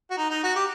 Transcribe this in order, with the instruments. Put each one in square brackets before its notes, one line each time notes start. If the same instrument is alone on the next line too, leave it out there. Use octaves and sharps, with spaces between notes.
[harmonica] F#4
D#4
D#4
F#4
G4